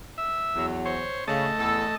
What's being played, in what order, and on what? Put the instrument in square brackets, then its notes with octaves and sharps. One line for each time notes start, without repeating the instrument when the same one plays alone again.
[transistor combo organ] E5
[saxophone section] E2 F#3
[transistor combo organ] C5 C#5
[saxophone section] C#3 [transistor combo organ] A3 D#5 A5
[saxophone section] E2 A4